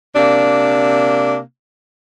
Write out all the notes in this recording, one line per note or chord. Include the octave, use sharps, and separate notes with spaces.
C3 A#3 D4